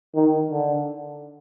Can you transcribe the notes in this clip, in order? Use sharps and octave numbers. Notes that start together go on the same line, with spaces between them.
D#3
D3